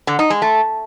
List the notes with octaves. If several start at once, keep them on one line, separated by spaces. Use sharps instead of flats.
D3
D#4
G#3
A3